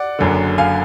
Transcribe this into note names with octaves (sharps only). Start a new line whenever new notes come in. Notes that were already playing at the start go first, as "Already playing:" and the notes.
Already playing: D5 F#5
F#1 F#2 D3
F5 G#5